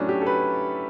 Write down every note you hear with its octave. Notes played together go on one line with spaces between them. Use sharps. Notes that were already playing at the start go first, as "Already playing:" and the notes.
Already playing: A2 F#3 A3 C#4 D4
G4
A4
B4